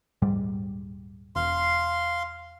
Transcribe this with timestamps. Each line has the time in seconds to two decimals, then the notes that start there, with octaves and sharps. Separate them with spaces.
0.22 D#1 G#2 G3
1.36 E1 F5 C6